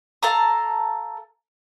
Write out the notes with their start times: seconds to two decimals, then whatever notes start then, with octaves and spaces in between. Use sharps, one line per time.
0.23 A4 F5 A#5